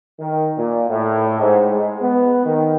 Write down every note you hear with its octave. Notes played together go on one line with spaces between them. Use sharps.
D#3
A#2
A2
G#2
G#3
B3
D#3